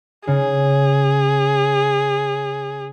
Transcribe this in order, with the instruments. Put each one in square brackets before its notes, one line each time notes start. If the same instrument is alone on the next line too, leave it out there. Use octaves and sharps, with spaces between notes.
[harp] C#3 [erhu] G#4